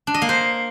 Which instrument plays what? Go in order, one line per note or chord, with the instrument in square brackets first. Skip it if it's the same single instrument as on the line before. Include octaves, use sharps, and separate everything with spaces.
[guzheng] D4
D#5
A#3
C5